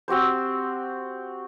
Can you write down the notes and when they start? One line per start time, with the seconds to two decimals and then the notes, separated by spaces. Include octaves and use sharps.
0.08 C4 F#4 G4 C5